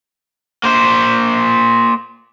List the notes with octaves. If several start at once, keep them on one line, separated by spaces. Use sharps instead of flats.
A#3 C5